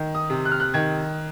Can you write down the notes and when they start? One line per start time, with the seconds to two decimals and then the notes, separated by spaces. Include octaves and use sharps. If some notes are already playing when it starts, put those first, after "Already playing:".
Already playing: D#3
0.15 D#6
0.30 C3
0.45 F#6
0.52 F6
0.60 F#6
0.74 D#3 G#6